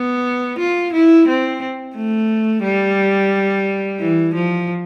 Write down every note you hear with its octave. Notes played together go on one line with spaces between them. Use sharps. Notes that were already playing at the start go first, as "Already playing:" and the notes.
Already playing: B3
F4
E4
C4
A3
G3
E3
F3